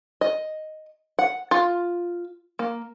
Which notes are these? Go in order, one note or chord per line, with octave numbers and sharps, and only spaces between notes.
D#5
F#5
F4
A#3